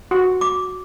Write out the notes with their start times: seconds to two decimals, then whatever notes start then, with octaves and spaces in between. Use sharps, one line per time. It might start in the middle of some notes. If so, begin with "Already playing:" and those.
0.11 F#4
0.41 D6